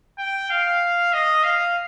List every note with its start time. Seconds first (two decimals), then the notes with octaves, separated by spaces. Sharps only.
0.18 G5
0.50 F5
1.13 D#5
1.44 F5